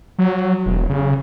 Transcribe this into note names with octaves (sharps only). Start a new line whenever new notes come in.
F#3
E1
C#3